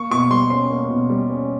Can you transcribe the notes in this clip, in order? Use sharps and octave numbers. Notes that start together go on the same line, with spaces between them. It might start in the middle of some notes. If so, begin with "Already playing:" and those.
Already playing: A#3 C#6
B2 C#6
G3 C6
C#4 C6
A#3
B2
G3
C#4